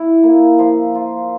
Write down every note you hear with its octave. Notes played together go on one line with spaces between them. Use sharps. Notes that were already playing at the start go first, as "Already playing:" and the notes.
Already playing: E4
A#3
F3
F4